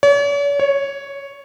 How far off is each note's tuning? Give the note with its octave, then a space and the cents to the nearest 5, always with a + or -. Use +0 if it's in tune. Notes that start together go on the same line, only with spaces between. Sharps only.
C#5 +45
C#5 +0